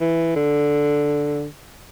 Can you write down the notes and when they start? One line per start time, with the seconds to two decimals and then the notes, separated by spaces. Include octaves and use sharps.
0.01 E3
0.36 D3